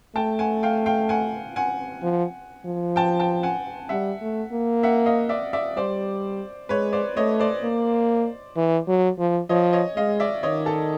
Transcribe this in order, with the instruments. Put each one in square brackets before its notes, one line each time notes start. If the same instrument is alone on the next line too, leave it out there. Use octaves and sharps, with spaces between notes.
[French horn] A3 [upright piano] G5 A5
[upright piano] F#5 G#5
F5 G5
F5 G5
F#5 G#5
F#5 G#5
[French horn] F3
F3
[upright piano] G5 A5
G5 A5
F#5 G#5
[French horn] G3 [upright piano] E5 F#5
[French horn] A3
A#3
[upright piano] E5 F#5
D#5 F5
D5 E5
D5 E5
[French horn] G3 [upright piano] C5 D5
[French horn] G#3 [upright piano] B4 C#5
[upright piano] C5 D5
[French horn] A3 [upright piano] C#5 D#5
[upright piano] C5 D5
[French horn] A#3
E3
F#3
F3
[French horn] F3 [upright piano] C#5 D#5
[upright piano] C#5 D#5
[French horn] G#3 [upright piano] D#5 F5
[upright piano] D5 E5
[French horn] D#3 [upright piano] C#5 D#5
[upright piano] A4